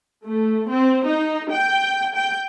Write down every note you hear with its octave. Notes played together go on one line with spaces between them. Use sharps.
A3
C4
D#4
G5
G5